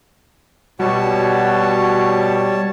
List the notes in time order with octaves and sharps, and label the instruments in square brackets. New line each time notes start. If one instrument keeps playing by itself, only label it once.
[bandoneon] B2 [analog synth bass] G3 [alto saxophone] F#4 [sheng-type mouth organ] C#5 A5